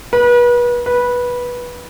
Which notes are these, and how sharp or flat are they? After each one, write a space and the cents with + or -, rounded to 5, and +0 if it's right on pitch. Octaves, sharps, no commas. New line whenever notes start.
B4 -35
B4 -15